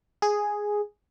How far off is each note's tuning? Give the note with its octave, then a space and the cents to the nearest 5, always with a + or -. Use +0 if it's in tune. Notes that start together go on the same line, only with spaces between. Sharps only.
G#4 +0